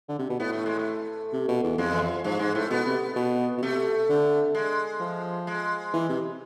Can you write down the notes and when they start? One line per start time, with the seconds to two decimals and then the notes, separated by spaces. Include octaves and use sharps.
0.09 D3
0.19 C3
0.30 B2
0.40 A2 B3
0.53 A3
0.66 G#3
0.79 A3
1.33 C3
1.48 B2
1.63 E2
1.78 F2 G#3
1.91 E3
2.02 F3
2.24 G#2 F3
2.39 G#2 G#3
2.55 A2 A3
2.70 B2 B3
2.86 C3
3.16 B2
3.58 B2
3.62 C3 A3
4.09 D3
4.55 G#3
5.00 F3
5.47 G#3
5.93 E3
6.09 C3